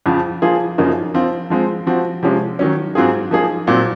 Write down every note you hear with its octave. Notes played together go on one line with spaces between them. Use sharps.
F2 C#3 F3
F3 A#3 F4 G#4
F#2 C#3 F3 A#3 D#4
F3 C4 F4
F3 G#3 C4
F3 C4 F#4
C3 F3 G#3 C#4
D#3 F#3 C#4
G#2 F#3 C4 F4 G#4
F3 A#3 D#4 G#4
A#2 F#3 C4